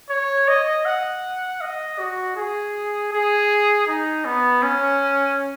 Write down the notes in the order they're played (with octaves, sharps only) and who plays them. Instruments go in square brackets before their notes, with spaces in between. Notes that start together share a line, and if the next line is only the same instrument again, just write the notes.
[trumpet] C#5
D#5
F#5
D#5
F#4
G#4
G#4
D#4
B3
C#4